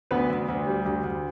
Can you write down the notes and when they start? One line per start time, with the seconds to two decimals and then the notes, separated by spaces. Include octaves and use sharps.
0.11 D2 B3 B4
0.30 D2
0.48 D2
0.67 G3
0.86 D2
1.04 D2